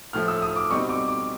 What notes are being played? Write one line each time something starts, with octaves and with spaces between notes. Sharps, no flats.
A2 F3 A3 F6
E6
D#6
D6
B2 G3 C4 D#4 C#6
D6
D6